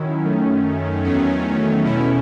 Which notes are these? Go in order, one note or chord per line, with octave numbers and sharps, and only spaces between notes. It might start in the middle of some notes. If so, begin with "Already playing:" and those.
Already playing: D#3 F#3 C#4 E4
F#2 D#3 A3 C#4
E2 D#3 F#3 A3 C#4
E2 B2 A3 C#4 E4